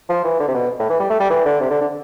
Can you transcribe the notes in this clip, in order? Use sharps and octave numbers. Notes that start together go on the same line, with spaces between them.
F3
E3
D3
C3
B2
A2
E3
G3
A3
G3
E3
D3
C3
D3
D3